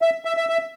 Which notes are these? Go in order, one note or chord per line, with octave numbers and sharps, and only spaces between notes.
E5
E5
E5
E5